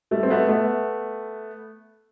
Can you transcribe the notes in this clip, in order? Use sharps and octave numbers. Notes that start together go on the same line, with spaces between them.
G3 A3
C4
A3 B3
A3 B3